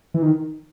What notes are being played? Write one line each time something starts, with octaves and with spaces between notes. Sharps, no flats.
E3
D#3